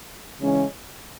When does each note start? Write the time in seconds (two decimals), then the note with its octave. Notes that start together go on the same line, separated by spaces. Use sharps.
0.41 C#3 E3 G#3 C#4